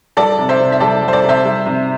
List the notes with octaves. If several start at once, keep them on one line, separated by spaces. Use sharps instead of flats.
G3 A4 D5
C3
C5 E5
C3
E5
G3 A4 D5
G3
C5
A4 D5
C3
C5 E5
G3
C3